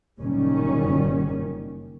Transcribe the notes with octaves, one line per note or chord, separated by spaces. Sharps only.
F#1 A#2 D#3 G3 C#4